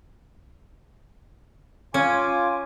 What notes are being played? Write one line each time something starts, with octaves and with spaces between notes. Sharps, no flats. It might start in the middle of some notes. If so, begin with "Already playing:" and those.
C#4 F4 G#5 D6